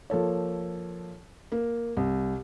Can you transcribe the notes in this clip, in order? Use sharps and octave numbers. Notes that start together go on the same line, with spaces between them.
F3 A#3 A4 C#5
A#3
C2